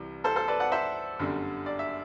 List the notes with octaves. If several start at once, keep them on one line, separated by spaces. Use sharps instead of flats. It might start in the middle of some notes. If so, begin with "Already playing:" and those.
Already playing: C2 C3 E3 G3
A4 C5
A4 C5
B4 D5
D5 F#5
C5 E5
G1 F#2 D3 G3
D5
E5